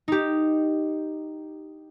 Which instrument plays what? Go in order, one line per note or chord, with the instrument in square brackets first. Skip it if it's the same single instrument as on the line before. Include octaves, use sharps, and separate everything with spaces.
[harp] D#4 G4